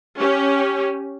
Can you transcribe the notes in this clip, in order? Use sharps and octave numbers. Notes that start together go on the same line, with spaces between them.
C#4 G4